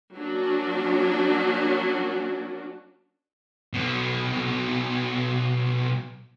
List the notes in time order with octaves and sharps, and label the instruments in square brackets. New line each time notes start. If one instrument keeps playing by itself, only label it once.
[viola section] F#3 A#3 C#4 D4 F#4
[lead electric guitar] B1 B2